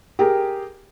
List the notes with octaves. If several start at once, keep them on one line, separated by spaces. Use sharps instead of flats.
G4 G#4 A#4